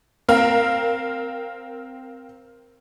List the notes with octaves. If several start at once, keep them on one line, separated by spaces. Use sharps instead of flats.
C4 A#4 F5